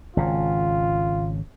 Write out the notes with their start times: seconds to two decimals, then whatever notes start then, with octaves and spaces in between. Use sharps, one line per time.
0.17 G#1 C#3 F4